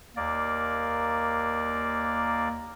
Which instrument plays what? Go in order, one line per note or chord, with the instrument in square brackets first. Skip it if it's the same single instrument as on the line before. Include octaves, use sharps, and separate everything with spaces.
[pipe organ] D#2 A#3 D5